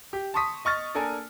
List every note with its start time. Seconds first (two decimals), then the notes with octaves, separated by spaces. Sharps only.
0.13 G4
0.34 A5 C6 C#6 D#6 B6
0.65 D#5 C#6 F6 A6
0.95 A#3 D4 A4 A#4 G#5